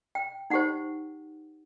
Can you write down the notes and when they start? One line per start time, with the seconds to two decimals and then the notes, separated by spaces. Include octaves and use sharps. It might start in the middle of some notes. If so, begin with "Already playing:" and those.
0.15 G5
0.50 D#4 G4 C5 F#5